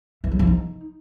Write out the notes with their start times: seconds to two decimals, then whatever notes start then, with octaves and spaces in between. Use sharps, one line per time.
0.24 E3
0.31 F#3
0.39 F3
0.47 D#4